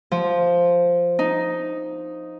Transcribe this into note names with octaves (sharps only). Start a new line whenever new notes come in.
F3
D#4